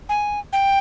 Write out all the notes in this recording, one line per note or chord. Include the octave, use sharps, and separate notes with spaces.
G#5
G5